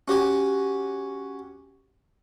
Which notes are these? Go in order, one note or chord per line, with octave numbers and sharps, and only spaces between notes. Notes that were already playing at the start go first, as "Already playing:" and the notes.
C#4 F#4 G4 G#5